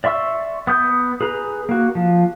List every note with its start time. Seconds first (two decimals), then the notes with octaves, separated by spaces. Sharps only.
0.04 D5 E5 C6 C#6 E6
0.67 B3 D#6 G6
1.21 G#4 B4 A#5
1.69 A#3 F#4
1.95 F3